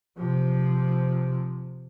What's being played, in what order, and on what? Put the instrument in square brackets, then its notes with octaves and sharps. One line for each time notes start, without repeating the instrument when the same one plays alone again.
[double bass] C3 F3